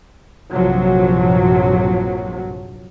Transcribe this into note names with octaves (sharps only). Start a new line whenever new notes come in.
A#1 G2 C3 F3 F#3